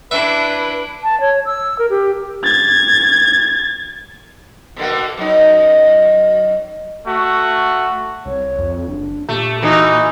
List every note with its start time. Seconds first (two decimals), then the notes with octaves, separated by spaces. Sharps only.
0.11 D4 E4 B4 E5
1.03 A5
1.21 C#5
1.46 E6
1.79 A#4
1.90 G4
2.44 G#6 A6
4.76 B2 D3 A#3
5.17 F#2 D#4
7.05 A3 F#4
8.26 C2 C#5
8.58 F2
8.88 F#1 D4
9.29 A#2 A3 G4
9.62 E3 D#4 F#4